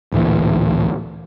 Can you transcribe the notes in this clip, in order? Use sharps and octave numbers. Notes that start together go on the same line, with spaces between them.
A1 D2 A#2 E3